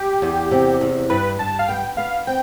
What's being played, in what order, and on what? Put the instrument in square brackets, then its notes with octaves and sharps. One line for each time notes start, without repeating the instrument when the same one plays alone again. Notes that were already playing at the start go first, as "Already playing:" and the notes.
Already playing: [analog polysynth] G4
[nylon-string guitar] E2
C3
E2
[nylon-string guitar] G2 [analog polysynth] B4
[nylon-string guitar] G2 [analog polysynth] A5
[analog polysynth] F5
[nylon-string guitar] B3 [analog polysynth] G5
[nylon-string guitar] B3 [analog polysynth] F5
[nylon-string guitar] C4 [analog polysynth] G5